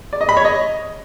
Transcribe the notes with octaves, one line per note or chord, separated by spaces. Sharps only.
D5
D#5
B5
C#5
D#5